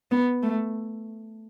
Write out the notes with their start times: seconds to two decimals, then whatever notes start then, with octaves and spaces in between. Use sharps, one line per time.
0.11 B3
0.42 A3